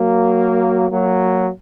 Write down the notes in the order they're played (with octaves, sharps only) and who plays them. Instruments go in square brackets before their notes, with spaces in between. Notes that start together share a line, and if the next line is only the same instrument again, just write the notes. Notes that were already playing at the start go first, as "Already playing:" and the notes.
Already playing: [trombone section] F#3 A#3
F#3 A#3